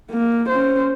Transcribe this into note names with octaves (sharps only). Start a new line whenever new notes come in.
A#3
C#4 C5